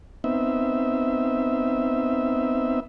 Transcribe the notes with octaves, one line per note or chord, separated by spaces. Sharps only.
B3 C4 D#4 E5